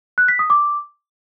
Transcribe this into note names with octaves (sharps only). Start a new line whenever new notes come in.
F#6
B6
D#6
D6